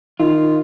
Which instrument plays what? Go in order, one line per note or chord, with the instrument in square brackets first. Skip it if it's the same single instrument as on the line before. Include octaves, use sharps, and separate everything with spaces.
[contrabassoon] D#3 [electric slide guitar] F4